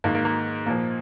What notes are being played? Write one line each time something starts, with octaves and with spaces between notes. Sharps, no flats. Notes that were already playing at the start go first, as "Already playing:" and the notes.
G#2 D#3 A#3
A#3
A#3
A#2 F3 A#3